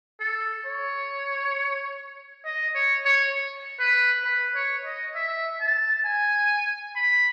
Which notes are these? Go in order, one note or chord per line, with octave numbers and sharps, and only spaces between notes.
A4
C#5
D#5
C#5
C#5
B4
B4
C#5
D#5
E5
A5
G#5
B5